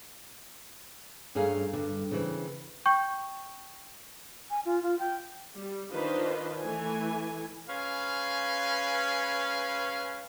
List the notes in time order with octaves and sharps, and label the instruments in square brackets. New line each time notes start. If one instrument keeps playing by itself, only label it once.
[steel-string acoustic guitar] G2 A3 C#4 G#4 F5 A#5
G2 D3
C#3 E3 C4
[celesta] G5 C#6 G6
[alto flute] G#5
F4
F4
G5
[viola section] G3
D#3 D4 F4 B4 C5 D#5
E3 A3 G#5
[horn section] G#3 C#4 B4 F5